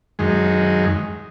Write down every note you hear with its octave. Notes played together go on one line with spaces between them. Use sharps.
F#2 D#3 G#3